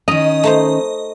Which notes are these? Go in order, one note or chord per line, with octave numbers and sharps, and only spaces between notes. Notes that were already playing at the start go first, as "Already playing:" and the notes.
D#3 C#4 D#5 A#5
A3 D#4 C5